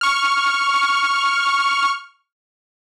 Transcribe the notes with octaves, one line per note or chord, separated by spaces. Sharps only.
C#6 F6